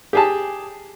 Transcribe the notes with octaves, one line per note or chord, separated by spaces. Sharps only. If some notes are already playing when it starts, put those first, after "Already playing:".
G4 G#4 A5